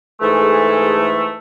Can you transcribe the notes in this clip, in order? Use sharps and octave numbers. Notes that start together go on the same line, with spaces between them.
G#2 E3 A3 G#4 A4